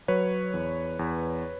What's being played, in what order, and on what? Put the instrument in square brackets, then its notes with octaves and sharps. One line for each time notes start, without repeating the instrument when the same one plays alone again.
[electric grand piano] F#3 B4 C#5
E2
E2